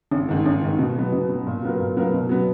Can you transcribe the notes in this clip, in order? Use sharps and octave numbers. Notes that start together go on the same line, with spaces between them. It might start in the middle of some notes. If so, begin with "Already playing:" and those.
G#1
G#2 D#3
G#1
G#2 D#3
B2
F#3 B3
B2
F#3 B3
A#2
F#3 B3 F4 A#4
A#2
F#3 B3 F4 A#4
B2
F#3 B3